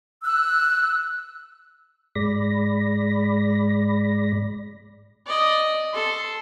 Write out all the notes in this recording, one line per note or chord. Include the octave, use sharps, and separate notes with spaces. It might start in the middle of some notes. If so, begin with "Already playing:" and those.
E6 F#6
G#2 G#3 D5 B5 A#6
D5 D#5
A4 C6